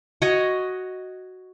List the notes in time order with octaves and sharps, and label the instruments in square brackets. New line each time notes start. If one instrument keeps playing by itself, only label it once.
[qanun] F#4 C#5 D#5